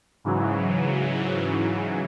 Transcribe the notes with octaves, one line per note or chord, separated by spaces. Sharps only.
G#2 C#3 E3 F#3